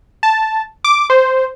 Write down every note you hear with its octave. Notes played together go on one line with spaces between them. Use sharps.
A5
D6
C5